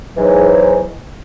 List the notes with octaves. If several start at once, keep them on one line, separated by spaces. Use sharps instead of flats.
E2 G#2 E3 F#3